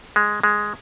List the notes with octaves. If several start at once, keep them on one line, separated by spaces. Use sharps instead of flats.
G#3
G#3